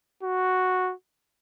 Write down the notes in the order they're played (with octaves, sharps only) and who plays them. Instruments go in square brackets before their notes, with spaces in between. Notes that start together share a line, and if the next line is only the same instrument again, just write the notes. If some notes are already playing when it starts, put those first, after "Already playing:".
[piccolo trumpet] F#4